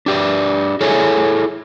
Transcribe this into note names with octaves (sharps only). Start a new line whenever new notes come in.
D4 G4 D5 E5
E4 G#4 A4 C#5 E5 G#5